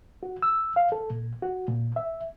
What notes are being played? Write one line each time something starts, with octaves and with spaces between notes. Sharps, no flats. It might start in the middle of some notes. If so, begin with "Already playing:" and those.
F#4
E6
F5
A4
A#2
F#4
A#2
E5